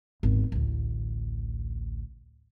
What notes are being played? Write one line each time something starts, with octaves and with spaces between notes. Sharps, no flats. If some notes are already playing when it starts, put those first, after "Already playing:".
G#1 E2
A1 D2